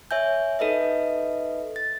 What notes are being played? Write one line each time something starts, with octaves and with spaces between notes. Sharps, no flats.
C#5 E5 G#5 G6
D#4 A4 B4 D#5 E5
A6